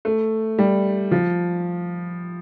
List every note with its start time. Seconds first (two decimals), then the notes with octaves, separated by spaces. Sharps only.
0.05 A3
0.59 G3
1.11 F3